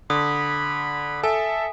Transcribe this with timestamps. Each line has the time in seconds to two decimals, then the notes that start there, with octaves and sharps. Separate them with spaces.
0.10 D3 B5 D#6
1.24 A4 E5 G#5